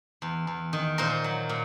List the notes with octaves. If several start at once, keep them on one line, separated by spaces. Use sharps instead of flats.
E2
E2
D#3
A#2 A#4 C5
F#3
A#2